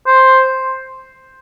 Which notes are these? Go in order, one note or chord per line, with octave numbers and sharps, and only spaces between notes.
C5